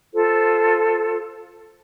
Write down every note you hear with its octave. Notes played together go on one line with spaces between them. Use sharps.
F4 A4 C5